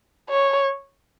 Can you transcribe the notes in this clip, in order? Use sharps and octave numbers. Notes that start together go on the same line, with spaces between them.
C#5